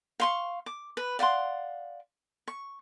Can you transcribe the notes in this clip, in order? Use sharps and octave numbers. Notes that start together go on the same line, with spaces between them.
F5 C6 C#6
D6
B4
D5 F5 F#5 C6
C#6